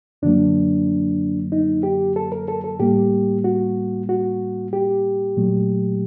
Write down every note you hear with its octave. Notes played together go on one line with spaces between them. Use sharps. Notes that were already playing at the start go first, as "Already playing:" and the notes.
F#2 D3 F#3 A#3 D4
D#4
G4
A4
A#4
A4
A4
A2 G3 A#3 G4
F#4
F#4
G4
A#2 F#3 A3